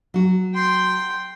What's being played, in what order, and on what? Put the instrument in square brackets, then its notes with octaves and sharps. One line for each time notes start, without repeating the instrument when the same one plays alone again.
[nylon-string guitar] F#3 F#4
[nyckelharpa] G5 C6